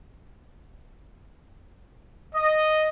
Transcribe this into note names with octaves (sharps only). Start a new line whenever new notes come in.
D#5